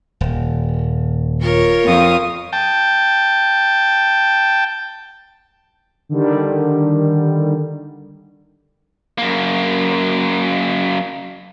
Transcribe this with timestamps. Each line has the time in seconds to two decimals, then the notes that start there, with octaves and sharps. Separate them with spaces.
0.21 D#1
1.41 F4 A#4 C#5
1.85 F2 F5 D#6
2.53 G5 A5
6.09 D3 D#3 G3
9.18 F#2 A#3